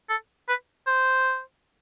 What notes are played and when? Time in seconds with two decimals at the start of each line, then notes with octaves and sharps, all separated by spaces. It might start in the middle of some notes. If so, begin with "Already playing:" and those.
0.10 A4
0.49 B4
0.87 C5